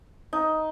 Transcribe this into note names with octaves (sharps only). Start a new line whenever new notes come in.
D#4